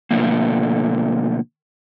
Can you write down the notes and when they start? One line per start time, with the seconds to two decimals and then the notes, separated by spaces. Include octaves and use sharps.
0.11 B2 D3 D#3 F3 A3 A#3